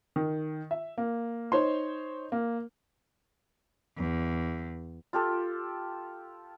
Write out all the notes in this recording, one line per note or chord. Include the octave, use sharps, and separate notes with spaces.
D#3
E5
A#3
D#4 C5 C#5 C6
A#3
E2
F4 G4 A4